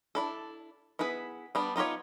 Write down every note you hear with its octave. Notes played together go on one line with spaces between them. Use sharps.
D4 E4 A4
B3 E4 G#4 B4
G3 B3 D4
B3 D#4 F4 G4 C#5